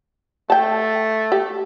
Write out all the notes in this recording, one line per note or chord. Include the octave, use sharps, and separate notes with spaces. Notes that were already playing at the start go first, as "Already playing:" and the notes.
A3 G5 A5
G4